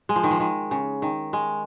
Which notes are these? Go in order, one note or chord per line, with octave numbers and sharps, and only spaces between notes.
G#3
F3
D#3
F3
D#3
C#3
D#3
G#3